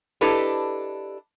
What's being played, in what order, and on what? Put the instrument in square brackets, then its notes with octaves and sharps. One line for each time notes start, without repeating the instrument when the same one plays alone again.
[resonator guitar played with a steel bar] D4 E4 G4 A4 B4 D#5